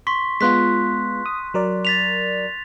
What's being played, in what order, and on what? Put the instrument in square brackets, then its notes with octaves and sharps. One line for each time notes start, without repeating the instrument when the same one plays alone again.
[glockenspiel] C6 C#6 B6
[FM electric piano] G#3 B3 F4 [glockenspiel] C6 F#6 B6
[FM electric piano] D#6
F#3 A#4 D5
[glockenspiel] A6 B6 F7